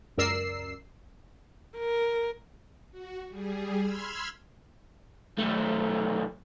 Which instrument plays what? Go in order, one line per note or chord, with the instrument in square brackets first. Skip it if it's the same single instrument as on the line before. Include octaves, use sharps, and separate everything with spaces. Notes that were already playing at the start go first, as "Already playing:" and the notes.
[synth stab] C#2 F#2 A#4 D5 E6 C7
[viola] A#4
[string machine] F#4
G3 G#4
B5 C6 E6 F6 G#6
[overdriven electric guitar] B1 A3